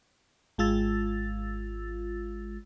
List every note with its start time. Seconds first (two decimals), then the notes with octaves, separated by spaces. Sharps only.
0.58 G#1 G#3 F4 E6 A6